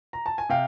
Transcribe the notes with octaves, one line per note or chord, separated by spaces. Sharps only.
A#5
A5
G#5
C3 F5 G5